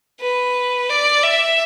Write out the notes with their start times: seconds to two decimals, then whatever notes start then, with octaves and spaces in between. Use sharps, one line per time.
0.20 B4
0.89 D5
1.24 E5